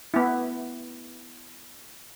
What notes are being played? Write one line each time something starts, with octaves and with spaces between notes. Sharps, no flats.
B3 E4